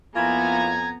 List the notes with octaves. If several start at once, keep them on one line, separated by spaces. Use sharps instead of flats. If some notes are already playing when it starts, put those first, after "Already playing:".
F2 A#3 B3 E4 F4 G#5 A#5 G#6